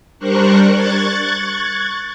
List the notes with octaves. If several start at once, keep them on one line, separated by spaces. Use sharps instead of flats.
G3 D4 A#4 C5 C#6 F#6
C#6 F#6 G#6 A6